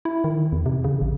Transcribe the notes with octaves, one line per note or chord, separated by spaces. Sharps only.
E4
D#3
E2
C3
C#3
A1